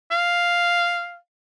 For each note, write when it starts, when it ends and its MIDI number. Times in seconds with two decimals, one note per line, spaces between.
0.11 1.16 77